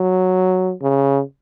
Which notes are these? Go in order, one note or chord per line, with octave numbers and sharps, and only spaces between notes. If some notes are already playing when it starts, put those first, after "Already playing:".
Already playing: F#3
C#3